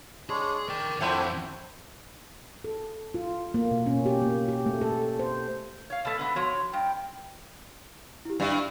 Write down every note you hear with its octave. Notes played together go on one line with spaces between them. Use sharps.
G#3 D4 G#4 C#5
A#4 D5 G5
F2 F3 A3 C4 D4 E4 C5 F#5
A4
F4
A#3
B2
C#4
G4
A#3
G4
A3
A4
C5
C#5 F5
B2 A3
B2 D3 B3
F3 F#4 C#5 C6
G2 G5
E4 G4
G2 D5 E5
D4